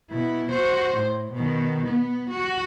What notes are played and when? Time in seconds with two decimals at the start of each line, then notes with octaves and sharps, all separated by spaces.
0.10 B2 E4
0.52 F#4 C5
0.97 A2
1.33 B2 D#3
1.88 B3
2.31 F#4